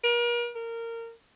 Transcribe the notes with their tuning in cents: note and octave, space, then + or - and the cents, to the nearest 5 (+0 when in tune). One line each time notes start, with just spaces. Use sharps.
A#4 +40
A#4 -20